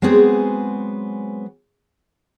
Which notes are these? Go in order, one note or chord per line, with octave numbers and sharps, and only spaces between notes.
F#3 G#3 B3 C4 G#4